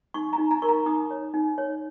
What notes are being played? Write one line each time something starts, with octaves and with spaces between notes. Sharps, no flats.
D#4 C#6
A#5
D#4
A#5
A#4 C#6
A#5
D#4 D#6
C#5
D#4
C#5